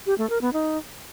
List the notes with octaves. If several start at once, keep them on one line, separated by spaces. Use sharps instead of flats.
G4
A3
A#4
B3
D#4